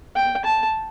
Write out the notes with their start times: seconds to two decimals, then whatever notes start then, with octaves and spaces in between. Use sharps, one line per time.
0.15 G5
0.45 A5